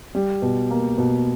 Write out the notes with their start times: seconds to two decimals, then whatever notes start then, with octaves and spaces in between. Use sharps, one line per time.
0.15 G3
0.42 B2
0.71 A#3
0.98 B2